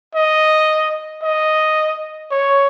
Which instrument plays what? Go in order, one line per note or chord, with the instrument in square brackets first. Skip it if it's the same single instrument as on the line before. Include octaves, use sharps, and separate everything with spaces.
[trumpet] D#5
D#5
C#5